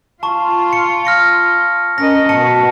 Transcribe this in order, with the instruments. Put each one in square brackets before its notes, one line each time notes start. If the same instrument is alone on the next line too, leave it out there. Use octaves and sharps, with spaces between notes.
[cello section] F4 [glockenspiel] A5 C#6
[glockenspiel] C#7
F6 A#6 C#7
[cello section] C#4 A#4 D#5 [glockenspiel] A#6
[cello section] B2 F#4 [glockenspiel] A5 C#7 D#7